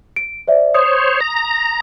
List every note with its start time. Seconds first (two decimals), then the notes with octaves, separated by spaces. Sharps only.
0.16 D7
0.48 C5 D5 E5
0.74 C5 C#5 D#6
1.21 A#5